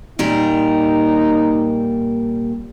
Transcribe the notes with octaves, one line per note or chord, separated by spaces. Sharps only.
A#2 G3 D#4 A#4